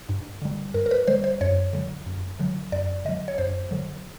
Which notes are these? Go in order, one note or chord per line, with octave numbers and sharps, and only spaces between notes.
G2
D3 G3
G2 A#4
A#4
B4
D3 G3 C5
C5
F#2 C#5
D3 F#3
F#2
D3 F#3
F#2 D5
D3 F#3 D#5
C#5
F#2 C5
D3 F#3